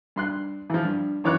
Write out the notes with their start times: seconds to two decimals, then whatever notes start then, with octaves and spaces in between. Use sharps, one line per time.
0.16 G2 C6 F#6
0.70 E3 F3
0.85 G2
1.24 F#2 E3 C#5 D6 F#6